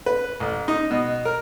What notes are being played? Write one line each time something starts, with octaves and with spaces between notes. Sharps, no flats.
B4
A1
D#4
B2
A#4